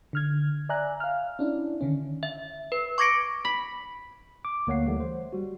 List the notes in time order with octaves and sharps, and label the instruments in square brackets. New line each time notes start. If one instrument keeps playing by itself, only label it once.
[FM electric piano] D3 F6 G#6
D5 E5 G#5 A#5 F#6
F5 F6
C#4 D4 E4
D3 D#3 C#4
[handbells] E5
B4
C#6 D6 G#6 A#6 C#7 D7
[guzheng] B5
[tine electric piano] D6
D2 A#3 C#5 F#5 C7
E3 G3 A3
C5
G3 F#4